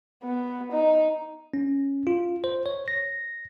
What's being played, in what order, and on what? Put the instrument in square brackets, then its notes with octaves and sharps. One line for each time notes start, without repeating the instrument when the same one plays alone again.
[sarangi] B3
D#4
[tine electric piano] C#4
F4
C5
C#5
A#6